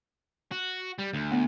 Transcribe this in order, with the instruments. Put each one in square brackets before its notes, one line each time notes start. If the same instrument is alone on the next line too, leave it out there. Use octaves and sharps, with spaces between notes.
[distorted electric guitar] F#4
G3
D2
[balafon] B3